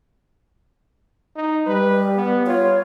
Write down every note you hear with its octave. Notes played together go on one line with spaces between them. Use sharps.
D#4
G3 B4
B3
F4 C#5